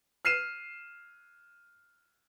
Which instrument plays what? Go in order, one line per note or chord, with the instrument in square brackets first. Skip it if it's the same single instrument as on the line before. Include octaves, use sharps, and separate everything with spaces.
[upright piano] F6 C7 D#7 E7